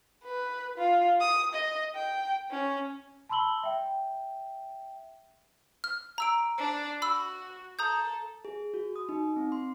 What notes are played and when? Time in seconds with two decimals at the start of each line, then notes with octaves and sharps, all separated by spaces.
0.24 B4
0.78 F4
1.21 D#6
1.54 D#5
1.95 G5
2.51 C#4
3.29 A5 B5 C6 E6 F#7 G7
3.63 E5 G5
5.84 F6
6.18 A#5 E6 D7
6.58 D4
7.02 F#4 B5 E6
7.79 A4 A#5 D#6 G6
8.45 G#4
8.74 F#4
8.96 D#6
9.09 D#4
9.36 C4
9.52 C6